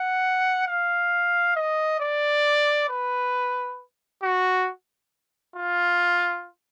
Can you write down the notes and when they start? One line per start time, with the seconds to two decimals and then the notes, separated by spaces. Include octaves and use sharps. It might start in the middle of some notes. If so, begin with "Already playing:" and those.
Already playing: F#5
0.67 F5
1.56 D#5
2.00 D5
2.89 B4
4.23 F#4
5.56 F4